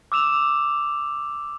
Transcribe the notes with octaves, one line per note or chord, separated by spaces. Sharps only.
D6 E6 E7 F7